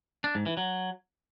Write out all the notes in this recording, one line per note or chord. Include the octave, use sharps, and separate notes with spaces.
D4
G#2
E3
F#3